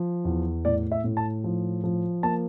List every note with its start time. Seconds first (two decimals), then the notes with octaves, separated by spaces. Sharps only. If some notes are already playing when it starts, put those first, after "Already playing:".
Already playing: F3
0.25 E2
0.65 A2 D5
0.92 E5
1.04 A2
1.17 A5
1.44 F3
1.84 F3
2.23 A#3 A5